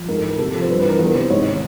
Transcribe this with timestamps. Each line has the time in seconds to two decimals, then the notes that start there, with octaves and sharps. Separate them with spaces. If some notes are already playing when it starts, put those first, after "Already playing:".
Already playing: F3
0.08 G#2 A#4
0.18 A4
0.24 E3
0.29 A#4
0.39 C3 A4
0.54 F3
0.61 C5
0.69 G2 B4
0.79 B4
0.84 E3 A#4
0.99 E2 A#4
1.15 C3 C5
1.30 G#2 C#5
1.45 D#3